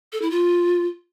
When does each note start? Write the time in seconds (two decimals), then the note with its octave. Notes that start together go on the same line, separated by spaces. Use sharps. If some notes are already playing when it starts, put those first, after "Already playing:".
0.13 A4
0.22 E4
0.31 F4